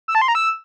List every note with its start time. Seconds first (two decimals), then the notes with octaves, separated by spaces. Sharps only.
0.08 E6
0.15 A5
0.22 C6
0.28 A#5
0.35 E6